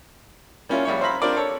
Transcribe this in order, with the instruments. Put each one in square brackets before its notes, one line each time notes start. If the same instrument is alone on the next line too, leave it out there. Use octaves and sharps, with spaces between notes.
[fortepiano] G3 A#3 C#4 E4 F4
A#1 G3 E4 C#5
C5 E5 F5 A#5 B5
G3 C4 D4 F4 A#4 D5
A4 C#5